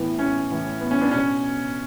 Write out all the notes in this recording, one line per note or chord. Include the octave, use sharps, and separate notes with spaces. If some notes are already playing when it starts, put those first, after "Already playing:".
Already playing: A2 E3 B3
C#4
A2 E3
B3
C#4
B3 D4
B2 C#4